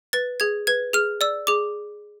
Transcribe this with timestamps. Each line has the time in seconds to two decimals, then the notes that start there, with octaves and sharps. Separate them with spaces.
0.13 B4 A6
0.40 G#4 G#6
0.67 B4 G#6
0.93 G#4 F6
1.21 D5 E6
1.47 G#4 D6